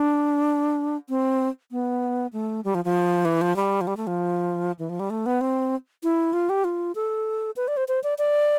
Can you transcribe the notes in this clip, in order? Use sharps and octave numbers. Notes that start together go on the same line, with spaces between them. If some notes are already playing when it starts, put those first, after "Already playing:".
Already playing: D4
C4
B3
A3
G3
F3
F3
E3
F3
G3
F3
G3
A3
F3
E3
F3
G3
A3
B3
C4
E4
F4
G4
F4
A4
B4
D5
C5
C5
D5
D5